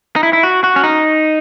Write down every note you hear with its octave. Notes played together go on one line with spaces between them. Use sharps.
D#4
E4
E4
F#4
F#4
C#4
D#4